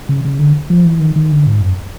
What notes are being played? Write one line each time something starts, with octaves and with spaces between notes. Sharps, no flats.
C#3
C#3
D3
F3
E3
D#3
D#3
D3
G#2
F#2